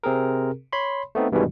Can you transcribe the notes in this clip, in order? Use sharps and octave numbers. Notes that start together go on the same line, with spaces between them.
C3 C4 G#4 A#4
C#5 B5 C6
A3 B3 C4 D#4
G2 B2 D#3 E3 G3 G#3